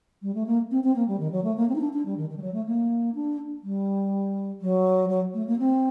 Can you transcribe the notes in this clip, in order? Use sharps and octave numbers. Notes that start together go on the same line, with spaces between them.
G3
A3
A#3
C4
C4
A#3
G3
D#3
F#3
A3
A#3
C4
D#4
D4
D4
G3
D#3
D#3
G3
F#3
A3
A#3
D4
G3
F#3
F#3
A3
A#3
C4